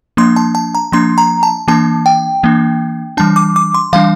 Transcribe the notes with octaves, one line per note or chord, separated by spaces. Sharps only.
F3 A#3 D4 C6
A5
A5
A#5
F3 A#3 D4 C6
A#5
A5
E3 A#3 D4 A5
G5
E3 A#3 D4
E3 G3 D4 A5
D6
D6
C6
E3 G3 D4 F5